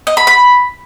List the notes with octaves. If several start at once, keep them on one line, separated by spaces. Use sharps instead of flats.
D#5
B5
B5